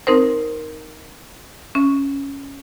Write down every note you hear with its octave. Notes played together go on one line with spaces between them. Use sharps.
C4 D#4 A#4 C5
C#4